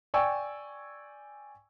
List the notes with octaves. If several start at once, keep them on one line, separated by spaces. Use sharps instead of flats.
D5 G5 G#5 C#6 E6